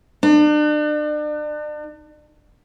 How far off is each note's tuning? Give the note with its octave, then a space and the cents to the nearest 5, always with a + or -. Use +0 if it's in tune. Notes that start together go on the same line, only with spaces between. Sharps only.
D4 +40